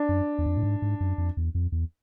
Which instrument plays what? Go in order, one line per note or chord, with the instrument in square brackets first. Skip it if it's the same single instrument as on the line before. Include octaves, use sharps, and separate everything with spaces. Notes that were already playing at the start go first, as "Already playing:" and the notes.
Already playing: [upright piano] D4
[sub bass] F#2
E2
F2
A2
G#2
G#2
F#2
F2
E2
F2
E2